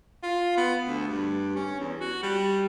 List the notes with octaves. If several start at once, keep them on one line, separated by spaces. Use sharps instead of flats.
F4
B3
D2
G2
C#4
E2
F#4
G3